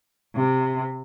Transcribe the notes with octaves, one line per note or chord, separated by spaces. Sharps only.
C3